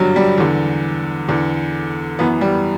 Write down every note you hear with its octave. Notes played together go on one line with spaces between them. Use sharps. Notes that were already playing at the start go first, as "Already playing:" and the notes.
Already playing: G2 D3 F#3 G3
G3
E2 D3
E2 D3
F#2 E3 B3
G3